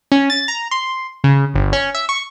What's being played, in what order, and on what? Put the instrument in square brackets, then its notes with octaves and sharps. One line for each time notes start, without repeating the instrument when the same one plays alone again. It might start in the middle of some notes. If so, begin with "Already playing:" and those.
[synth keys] C#4
A6
A#5
C6
C#3
G1
C#4
E5
C#6